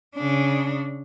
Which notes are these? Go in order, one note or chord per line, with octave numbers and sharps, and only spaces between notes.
C#3 D4